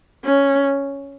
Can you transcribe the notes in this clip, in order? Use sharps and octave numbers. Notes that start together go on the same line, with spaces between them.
C#4